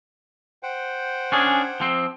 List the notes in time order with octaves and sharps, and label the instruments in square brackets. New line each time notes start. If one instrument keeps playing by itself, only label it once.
[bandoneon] C5 F#5 G5
[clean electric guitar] C#4 D4 G#4
F3 C4